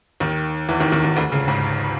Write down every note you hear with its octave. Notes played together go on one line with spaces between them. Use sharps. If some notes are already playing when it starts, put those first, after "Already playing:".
D#2 D#3
E2 E3
D#2 D#3
D#2 D#3
D#2 D#3
D2 D3
C#2 C#3
G#1 G#2